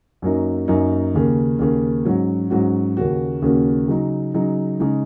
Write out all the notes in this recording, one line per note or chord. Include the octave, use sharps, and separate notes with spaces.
F#2 F#3 A#3 D#4
F#2 F#3 A#3 D#4
D#2 C#3 A#3
D#2 C#3 A#3
G#2 F#3 C#4 F#4
G#2 F#3 C#4 F#4
D#2 C#3 A#3 C#4 F#4
D#2 C#3 A#3 C#4 F#4
C#3 F#3 D#4
C#3 F#3 D#4
C#3 G#3 D#4